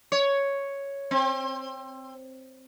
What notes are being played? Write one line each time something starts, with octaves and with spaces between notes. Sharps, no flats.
C#5
C4